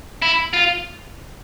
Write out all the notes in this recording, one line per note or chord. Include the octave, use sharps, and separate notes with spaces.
E4
F4